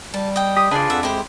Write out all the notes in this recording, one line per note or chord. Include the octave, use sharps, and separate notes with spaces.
G3 A5
D#5 G5
G4 D#6
C#3 D4 F4 G#4 B4 D5
F2 E5 F#5
G#3 E4 G4 C5